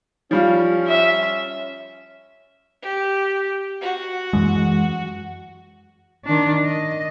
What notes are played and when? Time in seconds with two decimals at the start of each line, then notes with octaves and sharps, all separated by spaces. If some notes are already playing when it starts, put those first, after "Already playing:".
0.31 F3 G3 C#4 F4
0.87 E5
2.82 G4
3.82 F#4
4.33 F#2 E3 G#3
6.25 D#3 D4
6.64 D#5